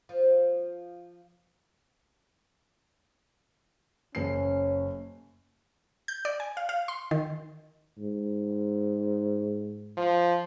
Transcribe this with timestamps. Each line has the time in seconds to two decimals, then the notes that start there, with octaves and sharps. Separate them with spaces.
0.09 F3
4.15 F#1 C#4 C7
6.08 G6
6.25 D5
6.40 G#5
6.57 F5
6.69 F5
6.88 C6
7.11 D#3
7.98 G#2
9.97 F3